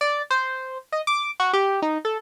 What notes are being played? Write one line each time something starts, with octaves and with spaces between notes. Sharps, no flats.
D5
C5
D#5
D6
F#4
G4
D#4
A4